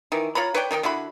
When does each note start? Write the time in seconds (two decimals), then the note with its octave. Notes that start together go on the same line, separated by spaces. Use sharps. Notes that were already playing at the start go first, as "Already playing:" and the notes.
0.12 D#3 E3
0.35 F4 C#5 A#5 B5
0.55 B4 C#5 D5 G5
0.71 D#3 D#4 G4 G5
0.83 D3 E4 F#4 B5